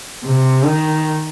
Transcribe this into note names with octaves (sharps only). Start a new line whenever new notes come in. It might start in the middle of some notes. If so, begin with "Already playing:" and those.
C3
D#3